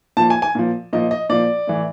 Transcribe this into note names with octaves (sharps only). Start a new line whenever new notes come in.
A#2 F3 A5
G#5
G#5
A#2 F3
A#2 F3 D#5
D#5
A#2 F3 D5
A2 E3